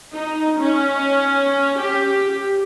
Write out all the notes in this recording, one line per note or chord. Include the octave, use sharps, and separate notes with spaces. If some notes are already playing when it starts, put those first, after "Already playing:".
D#4
C#4
G4